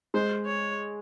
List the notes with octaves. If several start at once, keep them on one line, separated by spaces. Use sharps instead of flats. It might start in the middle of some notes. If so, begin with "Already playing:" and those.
G#3 C5
C#5